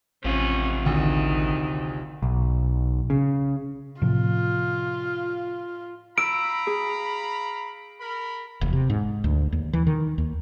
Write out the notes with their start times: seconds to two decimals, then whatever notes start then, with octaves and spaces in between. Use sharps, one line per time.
0.24 A1 C3 C#4 F4
0.86 D2 D#3
2.23 B1
3.10 C#3
4.02 A2 C3 F3 F4
6.18 F5 A#5 B5 E6 D7
6.67 G#4
8.00 A#4 B5
8.61 E1
8.73 C3
8.90 G#2
9.24 D2
9.52 D#2
9.73 E3
9.87 D#3
10.18 D#2